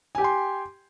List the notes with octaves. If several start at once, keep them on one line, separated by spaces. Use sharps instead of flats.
G4 G5 G#5 C6